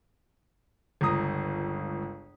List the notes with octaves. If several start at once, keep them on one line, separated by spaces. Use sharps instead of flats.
G1 C#2 A#5 D#6